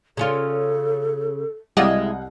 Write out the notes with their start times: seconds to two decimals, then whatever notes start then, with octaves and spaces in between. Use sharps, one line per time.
0.17 C#3 C#4 F4 A4
1.77 C2 G3 G#3 E4 G#4 D#5 F5 F#5